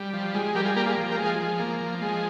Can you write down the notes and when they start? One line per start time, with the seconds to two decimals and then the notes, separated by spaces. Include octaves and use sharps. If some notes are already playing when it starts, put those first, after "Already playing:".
Already playing: G3
0.14 F3
0.34 G#3
0.55 G3 G4 A#4
0.65 F4 G#4
0.76 A#3 G4 A#4
0.86 F4 G#4
0.97 F3
1.11 G4 A#4
1.17 G#3
1.24 F4 G#4
1.39 F3
1.59 A#3
1.80 F3
2.02 G#3